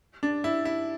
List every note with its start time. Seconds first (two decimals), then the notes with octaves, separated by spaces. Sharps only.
0.23 D4
0.44 E4
0.65 E4